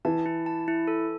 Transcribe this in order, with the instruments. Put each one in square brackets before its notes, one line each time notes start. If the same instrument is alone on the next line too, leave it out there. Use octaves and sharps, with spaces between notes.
[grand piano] E3 [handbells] A5
[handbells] E4
A5
E4
A4